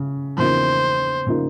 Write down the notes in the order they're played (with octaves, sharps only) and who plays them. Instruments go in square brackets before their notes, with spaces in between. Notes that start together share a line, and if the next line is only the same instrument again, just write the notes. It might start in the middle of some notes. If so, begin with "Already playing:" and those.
Already playing: [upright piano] C#3
[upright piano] E2 C#3 F3 A#3 D#4 [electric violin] C5
[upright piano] C#3 F3 A#3 D#4